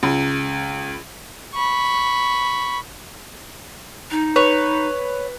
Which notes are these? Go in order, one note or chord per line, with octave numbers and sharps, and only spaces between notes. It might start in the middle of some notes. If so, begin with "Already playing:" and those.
C#2
B5 C#6
D#4
B4 C#5